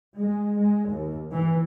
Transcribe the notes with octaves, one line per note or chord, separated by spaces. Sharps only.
G#3
G#3
D#2
E3